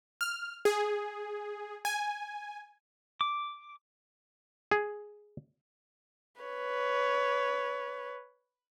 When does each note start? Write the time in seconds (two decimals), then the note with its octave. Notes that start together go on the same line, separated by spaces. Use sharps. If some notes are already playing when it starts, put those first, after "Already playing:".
0.21 F6
0.65 G#4
1.85 G#5
3.21 D6
4.71 G#4
6.41 B4 C#5